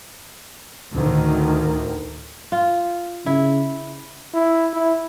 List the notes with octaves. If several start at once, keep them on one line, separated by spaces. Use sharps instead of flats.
D2 A2 D#3
F4
C#3 E4
E4
E4